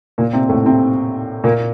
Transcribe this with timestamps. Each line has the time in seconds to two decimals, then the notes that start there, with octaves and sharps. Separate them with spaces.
0.18 A#2 A#3
0.33 C3 C4
0.49 A2 A3
0.65 C3 C4
1.44 A#2 A#3